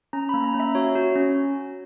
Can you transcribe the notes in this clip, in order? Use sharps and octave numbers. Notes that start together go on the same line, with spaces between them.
C#4 A#5
B5
A#3
A#5
C#4
E5
F#4 C#5
F#4
C#4